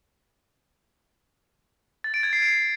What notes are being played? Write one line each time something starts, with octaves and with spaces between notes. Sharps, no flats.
A6
D7
G#6
C7
D7